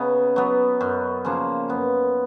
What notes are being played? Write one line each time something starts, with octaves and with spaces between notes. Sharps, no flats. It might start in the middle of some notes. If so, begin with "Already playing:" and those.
Already playing: C#3 B3 D#4
F#3 B3
F#2
C#3 F3 A#3
F#2 B3